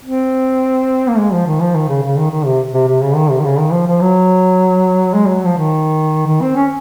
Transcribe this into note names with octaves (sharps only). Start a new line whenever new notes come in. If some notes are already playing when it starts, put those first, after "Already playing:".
C4
A#3
G#3
F3
D#3
F3
D#3
C#3
C#3
D#3
D#3
C3
C3
C3
C#3
D#3
C3
D#3
C#3
D#3
F3
F3
F#3
G#3
F#3
F3
D#3
D#3
C4
C#4